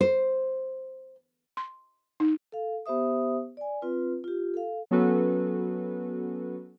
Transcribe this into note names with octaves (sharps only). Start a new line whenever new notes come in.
C5
C6
D#4
A4 F5
B3 G4 C5 E5 D#6
D5 G#5
C4 F4 B4
F4 G4
A4 F5
F#3 B3 C#4 F#4 A4 B4